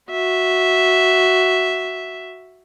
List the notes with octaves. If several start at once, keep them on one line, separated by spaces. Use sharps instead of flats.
F#4 E5